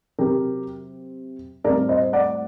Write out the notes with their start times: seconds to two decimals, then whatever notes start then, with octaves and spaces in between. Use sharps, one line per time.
0.19 C3 F#3 C4 G4 A#4
1.64 A2 G3 C4 A#4 D5
1.89 C5 D#5
2.13 D5 F#5